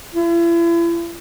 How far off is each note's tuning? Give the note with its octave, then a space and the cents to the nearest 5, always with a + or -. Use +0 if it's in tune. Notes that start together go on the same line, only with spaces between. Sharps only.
E4 +40